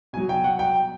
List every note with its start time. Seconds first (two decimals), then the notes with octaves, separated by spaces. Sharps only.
0.13 B2 F#3 G#5
0.29 G5
0.44 F#5
0.59 G5